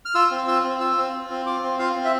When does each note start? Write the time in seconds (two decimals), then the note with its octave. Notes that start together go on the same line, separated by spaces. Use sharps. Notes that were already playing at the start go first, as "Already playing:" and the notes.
0.05 F6
0.15 F4 E6
0.31 C4
0.48 F4 E6
0.64 C4
0.80 F4 E6
0.97 C4
1.13 F4
1.30 C4
1.46 F4 D6
1.63 C4
1.79 F4 F5
1.95 C4
2.05 E5